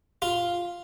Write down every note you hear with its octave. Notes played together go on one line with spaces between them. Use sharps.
F4